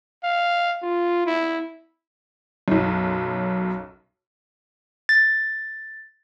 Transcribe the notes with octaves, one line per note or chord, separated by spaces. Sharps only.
F5
F4
E4
B1 F#2
A6